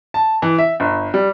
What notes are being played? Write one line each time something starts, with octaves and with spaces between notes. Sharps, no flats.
A5
E3
E5
G1
G3